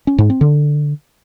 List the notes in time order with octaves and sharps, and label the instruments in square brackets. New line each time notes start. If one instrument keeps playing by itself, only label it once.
[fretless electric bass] C#4
G#2
C4
D3